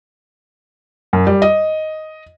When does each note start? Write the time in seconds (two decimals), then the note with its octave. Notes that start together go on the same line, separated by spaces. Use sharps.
1.13 F#2
1.27 G3
1.42 D#5